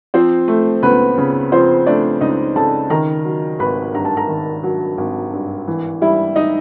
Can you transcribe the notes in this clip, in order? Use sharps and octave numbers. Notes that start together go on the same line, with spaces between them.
F3 C4 C5
A3
C#2 B3 B4
C#3
F3 C4 C5
A3 D4 D5
C#2 D#4 D#5
C#3 A4 A5
D#3 A#4 A#5
F#3
G#1 B4 B5
G2 A#5
A5
A#4 A#5
D#3
F#3
G#1
G2
E3
G3 E4 E5
D#4 D#5